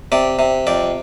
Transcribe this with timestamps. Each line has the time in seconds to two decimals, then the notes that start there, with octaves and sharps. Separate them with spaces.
0.12 C3 D5
0.39 C3
0.67 F2 D5